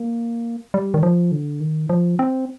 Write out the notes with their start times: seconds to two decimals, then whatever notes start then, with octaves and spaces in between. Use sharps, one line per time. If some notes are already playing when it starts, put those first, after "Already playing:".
Already playing: A#3
0.74 G3
0.94 D#3
1.03 F3
1.32 D3
1.60 D#3
1.90 F3
2.19 C4